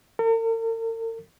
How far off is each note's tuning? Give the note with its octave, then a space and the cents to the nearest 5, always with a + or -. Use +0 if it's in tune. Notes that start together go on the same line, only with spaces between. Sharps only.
A#4 -45